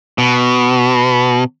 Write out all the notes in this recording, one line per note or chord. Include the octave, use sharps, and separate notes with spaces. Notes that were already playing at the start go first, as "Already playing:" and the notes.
B2